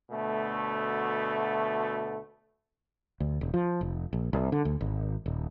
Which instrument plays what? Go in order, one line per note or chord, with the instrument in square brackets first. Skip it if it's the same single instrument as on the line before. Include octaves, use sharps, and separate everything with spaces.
[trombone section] D2 B2 A3
[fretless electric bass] D2
E1
F3
F1
A#1
C2
D3
D2
G#1
D#1